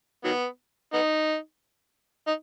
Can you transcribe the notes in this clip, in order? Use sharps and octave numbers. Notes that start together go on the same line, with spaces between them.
D#3 F#3 B3
B3 D#4
D#4